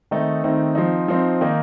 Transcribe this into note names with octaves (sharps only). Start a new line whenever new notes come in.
D#3 A3 C4 D#4
D#3 A3 C4 D#4
F3 C4 D#4
F3 C4 D#4
D#3 A#3 D#4